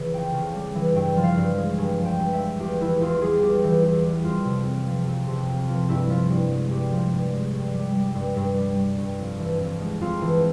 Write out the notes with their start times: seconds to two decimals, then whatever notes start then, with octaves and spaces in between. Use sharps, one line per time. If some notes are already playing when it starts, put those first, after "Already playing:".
Already playing: C#3 E3
0.13 F2 G5
0.34 C#3
0.55 G3
0.75 E3
0.95 G2 G5
1.16 F3
1.23 F5
1.37 G2
1.58 G#3
1.78 G2 G#5
1.98 F3
2.05 G5
2.20 G2
2.33 E5
2.39 G#3
2.60 E2 G4
2.81 E3 E4
3.01 E2 F4
3.21 G3 G#4
3.42 E2 G4
3.64 E3
3.83 E2
4.05 G3
4.24 F2 F4
4.45 C3
4.66 F2
4.87 F3
5.07 F2
5.27 C3
5.49 F2
5.69 F3
5.89 G2 E4
6.09 F3
6.30 G2
6.52 G#3
6.71 G2 G4
6.92 F3
7.12 G2
7.34 G#3
7.54 G2
7.74 G3
7.95 G3
8.15 G2
8.37 G2
8.57 G3
8.78 G3
8.98 G2
9.19 F2
9.39 E3
9.60 F2
9.79 G#3
10.01 F2 F4
10.21 E3